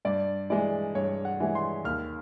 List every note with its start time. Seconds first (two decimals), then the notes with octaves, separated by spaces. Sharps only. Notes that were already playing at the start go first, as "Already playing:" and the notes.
0.05 G2 D5
0.50 E3 G#3 D5
0.95 G2 C#5
1.25 F#5
1.40 E3 G#3
1.55 C6
1.85 D#2 F6